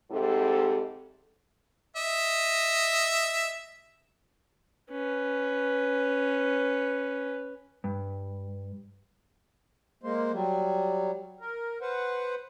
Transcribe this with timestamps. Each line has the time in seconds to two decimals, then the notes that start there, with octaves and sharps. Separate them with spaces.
0.11 G#2 C3 G3 A4
1.96 D#5 E5
4.91 C#4 B4
7.84 G2
10.03 G#3 A#3 C5
10.32 F#3 G3
11.41 A#4
11.81 B4 C5 F#5